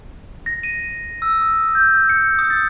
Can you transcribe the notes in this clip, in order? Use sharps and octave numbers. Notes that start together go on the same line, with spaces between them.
A#6
D#7
E6
D#6
G6
C#7
D#6
A6